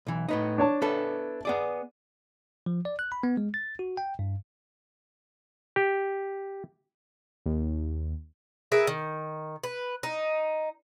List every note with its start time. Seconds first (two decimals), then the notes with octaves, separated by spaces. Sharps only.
0.07 B1 E3
0.29 A2 B3 D#4
0.58 D4 C#5 A5
0.82 B3 E4 A4
1.45 B3 G#4 D5
2.66 F3
2.85 D5
2.99 F#6
3.12 B5
3.23 B3
3.37 G#3
3.54 A6
3.79 F#4
3.97 G5
4.19 G2
5.76 G4
7.46 D#2
8.72 G#4 A#4 B4 E5
8.87 D#3
9.64 B4
10.03 D#4